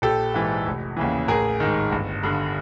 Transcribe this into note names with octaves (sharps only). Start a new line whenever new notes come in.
A#1 G4 A4
G#2 E3
F1
D#2 C#3 E3
A1 G#4 A#4
G#2 D#3
G1
G2 D3